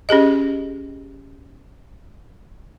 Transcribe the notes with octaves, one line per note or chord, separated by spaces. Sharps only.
C#4 G4 G#4 D#5